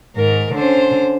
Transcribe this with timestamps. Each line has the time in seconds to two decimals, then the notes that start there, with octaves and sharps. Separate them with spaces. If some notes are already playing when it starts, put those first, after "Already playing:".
0.16 G#2 D#3 A#4
0.54 D3 C#4 C5